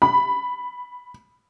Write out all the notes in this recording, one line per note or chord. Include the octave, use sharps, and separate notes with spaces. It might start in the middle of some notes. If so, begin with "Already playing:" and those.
B5